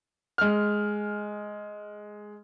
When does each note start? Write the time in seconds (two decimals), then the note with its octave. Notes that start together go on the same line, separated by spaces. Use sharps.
0.38 G#3 F6